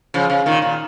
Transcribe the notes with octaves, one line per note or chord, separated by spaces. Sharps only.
C#3 F3
C#3
A#2 D#3
A#2